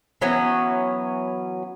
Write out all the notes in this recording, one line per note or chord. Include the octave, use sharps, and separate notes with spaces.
E3 F#3 B3 C#4